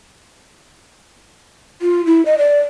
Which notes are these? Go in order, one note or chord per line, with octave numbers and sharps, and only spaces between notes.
F4
E4
D#5
D5